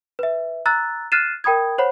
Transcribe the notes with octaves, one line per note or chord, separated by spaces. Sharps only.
B4 E5
A#5 E6 F#6 A6
F6 F#6 A6 C7 D#7 E7
A#4 G5 B5 D#6 G#6
C5 C#5 F#5 B5